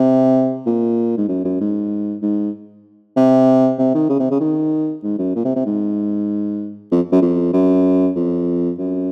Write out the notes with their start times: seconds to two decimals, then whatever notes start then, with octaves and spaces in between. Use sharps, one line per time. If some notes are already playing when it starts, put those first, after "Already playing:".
Already playing: C3
0.66 A#2
1.18 G#2
1.28 F#2
1.44 F#2
1.60 G#2
2.22 G#2
3.17 C3
3.78 C3
3.95 D#3
4.09 C#3
4.20 C3
4.31 C#3
4.40 D#3
5.03 G#2
5.19 F#2
5.35 A#2
5.45 C3
5.56 C3
5.66 G#2
6.91 F2
7.12 F#2
7.22 F2
7.53 F#2
8.16 F2
8.79 F#2